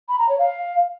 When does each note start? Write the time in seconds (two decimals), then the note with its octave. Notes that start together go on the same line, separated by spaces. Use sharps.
0.08 B5
0.18 A#5
0.28 C#5
0.38 F5